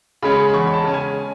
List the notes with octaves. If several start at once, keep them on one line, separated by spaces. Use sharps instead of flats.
C#3 G#3 C#4 B5
B5
E2 C#6
B5
A5
C#3 G#3 C#4
G#5